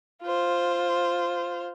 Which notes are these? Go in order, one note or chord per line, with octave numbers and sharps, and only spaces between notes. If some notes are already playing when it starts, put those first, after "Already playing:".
F4 C5